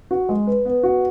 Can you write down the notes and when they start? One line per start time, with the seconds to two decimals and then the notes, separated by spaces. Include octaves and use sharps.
0.11 F#4
0.29 G#3
0.47 B4
0.65 B3
0.83 F#4